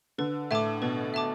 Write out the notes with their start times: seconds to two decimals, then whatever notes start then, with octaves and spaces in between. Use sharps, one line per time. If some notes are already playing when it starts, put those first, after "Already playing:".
0.18 D3 B4
0.51 A2 E5 A5 D6
0.82 B2 B4
1.14 E5 A5 D6